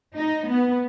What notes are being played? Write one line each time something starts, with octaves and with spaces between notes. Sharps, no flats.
D#4
B3